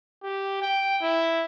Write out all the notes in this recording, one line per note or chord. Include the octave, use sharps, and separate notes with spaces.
G4
G5
E4